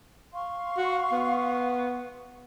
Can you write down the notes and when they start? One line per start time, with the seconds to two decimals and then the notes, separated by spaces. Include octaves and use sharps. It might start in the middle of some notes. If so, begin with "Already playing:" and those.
0.33 F5 C6 C#6
0.77 F#4
1.12 B3